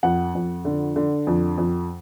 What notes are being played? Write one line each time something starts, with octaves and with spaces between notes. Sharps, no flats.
F2 F#5
F2
D3
D3
F2
F2